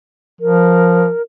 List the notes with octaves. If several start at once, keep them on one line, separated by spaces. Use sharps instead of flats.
F3 A#4